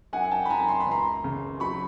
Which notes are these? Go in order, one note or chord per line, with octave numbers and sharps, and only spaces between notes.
F#2 F#5 G#5
G5 A5
B5
F#2 G#5 A#5
C6
B5
C#2 A#5 C6
C#3
F#3 B5 C#6